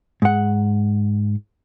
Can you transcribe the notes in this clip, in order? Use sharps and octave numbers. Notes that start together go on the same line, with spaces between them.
G#2 F#5